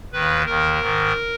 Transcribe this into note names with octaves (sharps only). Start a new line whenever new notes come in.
D#2 D#3 B4
D#2 D#3 A#4
G#2 D#3